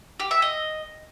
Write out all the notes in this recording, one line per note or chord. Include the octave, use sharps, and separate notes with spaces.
G4
E5
D#5